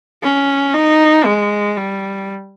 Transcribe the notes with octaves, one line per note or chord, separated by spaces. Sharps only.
C#4
D#4
G#3
G3